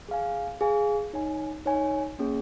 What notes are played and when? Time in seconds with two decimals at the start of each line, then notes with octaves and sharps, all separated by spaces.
0.08 G#4 F5 G#5
0.61 G#4 F5 G#5
1.13 D#4 C#5 G#5
1.65 D#4 C#5 G#5
2.19 A#3 C#4 G#4